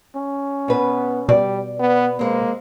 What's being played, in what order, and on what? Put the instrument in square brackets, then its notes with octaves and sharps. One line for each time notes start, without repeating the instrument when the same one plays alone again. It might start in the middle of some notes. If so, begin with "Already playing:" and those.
[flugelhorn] C#4
[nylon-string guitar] B2 B4 [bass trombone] B3
[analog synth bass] B2 [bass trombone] G3 [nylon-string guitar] D5
[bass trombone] B3 [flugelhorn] B4
[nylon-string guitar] G#3 C4 [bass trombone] A#3